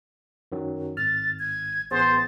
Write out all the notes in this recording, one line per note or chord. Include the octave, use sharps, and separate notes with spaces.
F#2 D#3 F#3
G#1 F6 A6
G#6
A1 B3 G#4 C5 A6